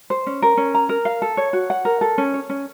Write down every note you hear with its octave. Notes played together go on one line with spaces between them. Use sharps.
C5
C#4
A#4
C#4
A#5
A#4
F5
A4
C#5
F#4
F#5
A#4
A4
C#4
C#5
C#4